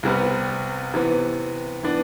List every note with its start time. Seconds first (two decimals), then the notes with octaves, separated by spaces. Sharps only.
0.03 C2 C3 G3 B3
0.94 C3 E3 B3
1.83 E3 B3 D4